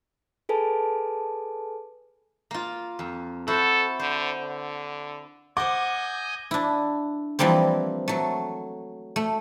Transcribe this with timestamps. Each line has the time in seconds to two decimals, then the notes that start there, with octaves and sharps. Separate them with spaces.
0.49 G#4 A4 B4 G#5 A5
2.51 A#3 F4
2.99 F2
3.48 E4 F#4 A4 C5
3.99 D3 C5
4.38 D3
5.57 C5 D#5 F#5 G#5 D6 G6
6.51 D4 E4
7.39 E3 F3 G3 A#3 C4
8.08 F#3 A3
9.16 A3